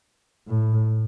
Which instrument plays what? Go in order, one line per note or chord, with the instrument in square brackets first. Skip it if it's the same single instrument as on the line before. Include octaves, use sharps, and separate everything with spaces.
[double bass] A2